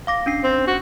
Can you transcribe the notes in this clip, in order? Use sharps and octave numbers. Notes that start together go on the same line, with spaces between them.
F5 D6 A#6
C#4 D4 C7
C4
F#4